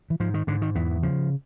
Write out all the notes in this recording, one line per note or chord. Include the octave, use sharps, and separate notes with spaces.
E3
G#2 F3
D#3
G#2 D3
D#3
E2 E3
C#3 F3